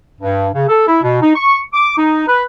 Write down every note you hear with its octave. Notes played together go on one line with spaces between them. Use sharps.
G2
C#3
A4
E4
B2
D#4
C#6
D6
D#4
B4